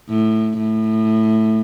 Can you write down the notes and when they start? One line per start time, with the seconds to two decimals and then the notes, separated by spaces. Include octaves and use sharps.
0.09 A2
0.58 A2